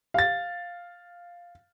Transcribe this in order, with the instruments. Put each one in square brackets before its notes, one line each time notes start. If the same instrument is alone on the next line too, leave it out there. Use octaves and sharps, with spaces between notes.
[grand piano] F5 A6